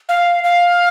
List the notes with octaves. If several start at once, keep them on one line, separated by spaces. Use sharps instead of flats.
F5
F5